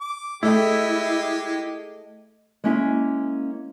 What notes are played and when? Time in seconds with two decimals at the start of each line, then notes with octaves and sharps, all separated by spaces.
0.01 D6
0.43 G#3 A3 E4 G4 D#5 G5
2.64 G#3 A#3 C#4 E4 G#4